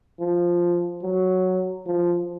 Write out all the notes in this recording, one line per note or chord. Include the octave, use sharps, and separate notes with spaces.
F3
F#3
F3